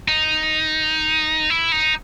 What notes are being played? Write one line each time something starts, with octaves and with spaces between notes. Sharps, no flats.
D#4
E4
D#4